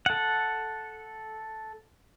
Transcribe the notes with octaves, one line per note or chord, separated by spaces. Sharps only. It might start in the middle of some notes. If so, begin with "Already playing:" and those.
A4 F#5